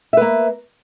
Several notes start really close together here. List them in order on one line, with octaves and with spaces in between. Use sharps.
E5 B4 A#3